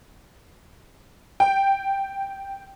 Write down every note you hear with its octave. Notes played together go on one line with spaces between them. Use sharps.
G5